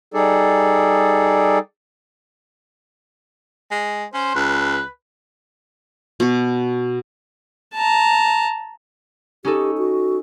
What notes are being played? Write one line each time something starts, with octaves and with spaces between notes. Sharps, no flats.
G3 D#4 G#4 A4 D5
G#3
C#4 C5
C#2 B4
B2 F#4
A5 A#5
C#4 D#4 G4 A4
F#4